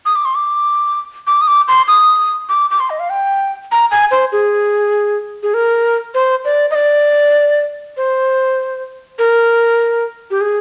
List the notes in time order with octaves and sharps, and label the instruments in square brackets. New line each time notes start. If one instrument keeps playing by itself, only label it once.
[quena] D#6
D6
C6
D6
D6
D#6
D6
C6
D#6
D6
D6
C6
D#5
F5
G5
A#5
G#5
C5
G#4
G#4
A#4
C5
D5
D#5
D5
C5
A#4
G4
G#4